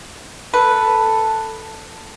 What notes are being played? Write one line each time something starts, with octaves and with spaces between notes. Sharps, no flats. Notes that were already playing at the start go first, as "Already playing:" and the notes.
A4 B4